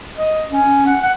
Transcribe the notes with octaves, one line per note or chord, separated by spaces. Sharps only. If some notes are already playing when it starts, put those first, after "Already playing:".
D#5
C#4
F#5
F#5